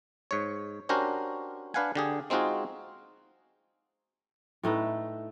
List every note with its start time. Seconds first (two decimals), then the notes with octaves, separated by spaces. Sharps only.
0.31 G#2 C#5
0.89 C#4 D4 F#4 G4 A#4 C5
1.74 D4 B4 F5 F#5 G#5
1.95 D3 G4 G#4
2.30 G#3 C4 D#4 F4 F#4 G#4
4.63 A2 A3 D#4 B4